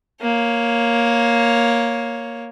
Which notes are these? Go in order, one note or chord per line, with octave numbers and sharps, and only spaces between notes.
A#3 C#5